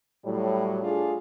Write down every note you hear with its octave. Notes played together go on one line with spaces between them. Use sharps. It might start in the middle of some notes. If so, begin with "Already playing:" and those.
A2 F#3 G3
A3 D4 F4 G#4